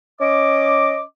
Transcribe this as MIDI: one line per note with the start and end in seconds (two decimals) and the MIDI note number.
0.21 1.01 61
0.21 1.01 75
0.21 1.01 86